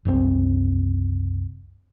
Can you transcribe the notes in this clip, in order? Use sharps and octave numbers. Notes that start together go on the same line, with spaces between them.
F#1 C2 A2 C4